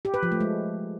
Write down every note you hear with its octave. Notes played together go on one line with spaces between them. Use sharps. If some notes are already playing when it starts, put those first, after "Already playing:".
G4
B4
F3
A3
G#3